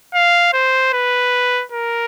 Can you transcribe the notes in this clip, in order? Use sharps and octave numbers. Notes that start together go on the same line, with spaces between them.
F5
C5
B4
A#4